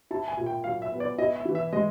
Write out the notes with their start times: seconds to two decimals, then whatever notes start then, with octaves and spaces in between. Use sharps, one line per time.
0.11 E4 A5
0.28 G#5
0.37 A#2
0.46 G5
0.64 F#3 F5
0.82 E5
0.91 B3
1.00 D5
1.18 E4 D#5
1.36 E5
1.45 E3
1.55 E5
1.73 G#3 D#5